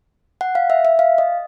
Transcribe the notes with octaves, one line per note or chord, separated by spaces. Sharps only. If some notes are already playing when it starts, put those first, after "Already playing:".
F#5
F5
E5
E5
F5
D#5